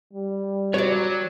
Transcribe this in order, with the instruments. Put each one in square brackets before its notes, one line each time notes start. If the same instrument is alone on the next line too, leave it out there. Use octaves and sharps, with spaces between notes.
[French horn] G3
[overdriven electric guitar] F#3 [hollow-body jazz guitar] C#5 D5